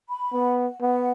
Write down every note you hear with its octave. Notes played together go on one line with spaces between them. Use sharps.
B5
B3 F#5
F#5
B3 F#5